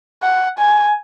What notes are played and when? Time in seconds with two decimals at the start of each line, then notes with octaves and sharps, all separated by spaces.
0.23 F#5
0.59 G#5